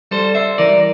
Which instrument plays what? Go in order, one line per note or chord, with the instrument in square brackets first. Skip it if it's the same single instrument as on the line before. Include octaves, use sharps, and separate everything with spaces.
[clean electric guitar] G3 A4 C5
C5 E5
E3 A#4 D5